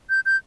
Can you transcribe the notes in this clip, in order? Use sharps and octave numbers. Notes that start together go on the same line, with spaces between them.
G6
G6